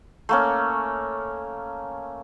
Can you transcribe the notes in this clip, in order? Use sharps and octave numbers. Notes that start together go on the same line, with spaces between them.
A3 A#3 C#4